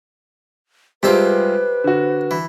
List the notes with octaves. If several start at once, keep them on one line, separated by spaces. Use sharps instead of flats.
C3 G3 G#3 C4 F4 A4 B4
D3 F#4
E3